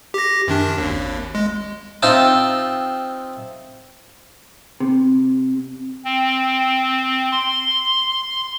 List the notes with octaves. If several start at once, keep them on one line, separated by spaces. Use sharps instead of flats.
G4 A#6
F#2 D#3 D4
G#1 D#2
G#3
C4 D#4 F4 E5 G5 A5
C3
C4
C6